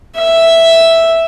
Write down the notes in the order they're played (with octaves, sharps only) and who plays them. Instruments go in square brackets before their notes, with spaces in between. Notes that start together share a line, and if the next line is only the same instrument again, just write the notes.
[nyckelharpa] E5